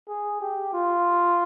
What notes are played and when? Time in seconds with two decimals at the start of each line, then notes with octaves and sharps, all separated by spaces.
0.08 G#4
0.41 G4
0.73 F4